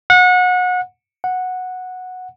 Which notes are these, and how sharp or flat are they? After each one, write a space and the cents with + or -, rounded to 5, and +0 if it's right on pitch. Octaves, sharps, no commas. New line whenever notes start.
F#5 -30
F#5 -10